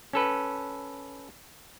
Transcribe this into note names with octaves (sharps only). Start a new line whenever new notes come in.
C#4 A4 B4